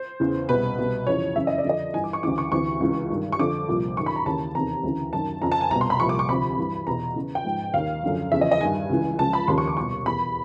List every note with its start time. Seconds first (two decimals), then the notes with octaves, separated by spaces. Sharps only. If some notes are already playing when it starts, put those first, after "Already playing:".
Already playing: C5
0.20 E2 C#3 E3
0.49 C2 B2 B4
0.78 C2 B2
1.07 F2 C#3 E3 C#5
1.36 F#2 C#3 E3 E5
1.47 D#5
1.58 D5
1.65 F2 D3 F3 D#5
1.93 G2 E3 G#5
2.04 D6
2.13 C#6
2.23 D2 C#3 E3 D6
2.38 C#6
2.52 D2 C3 E3 C#6
2.80 C#2 C#3 E3
3.10 G2 D#3
3.32 C#6
3.39 F2 D3 F3 D6
3.68 C2 A#2 F3
3.97 F#2 D#3 C#6
4.06 B5
4.16 A#5
4.26 D#2 C#3 E3 A5
4.55 E2 C3 D#3 A#5
4.84 D2 C#3 E3
5.13 F#2 D#3 A5
5.41 F2 C#3 F3 A#5
5.52 A5
5.61 G#5
5.70 C2 A#5
5.75 B2
5.81 C6
5.90 B5
6.00 C2 A#2 F3 C#6
6.09 D6
6.19 C#6
6.29 D2 C3 F3 B5
6.58 G2 E3
6.87 E2 B2 A#5
7.16 E2 C#3 E3
7.35 G5
7.45 G#2 F3
7.74 D#2 D#3 F5
8.03 F#2 D3 F3
8.32 E2 C#3 F3 E5
8.41 D#5
8.51 D#5
8.61 G2 D#3 G#5
8.89 C#2 C#3 E3
9.19 C#2 C#3 F3 A5
9.33 B5
9.48 D#2 C#3 F3 C6
9.58 C#6
9.67 D6
9.77 C2 B2 C#6
10.06 E2 B2 B5